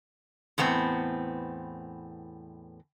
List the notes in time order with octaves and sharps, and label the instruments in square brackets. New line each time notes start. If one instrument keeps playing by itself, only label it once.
[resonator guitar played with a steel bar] E2 A2 B3 C4